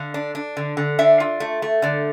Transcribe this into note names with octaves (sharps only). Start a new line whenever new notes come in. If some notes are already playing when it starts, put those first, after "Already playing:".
Already playing: D3 F5
D4
D4
D3
D3
D4 E5
F4
A3
A3
D3 D5